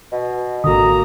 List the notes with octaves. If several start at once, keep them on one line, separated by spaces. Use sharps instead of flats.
B2
G#1 D3 A#3 F#4 A4 A#5 D#6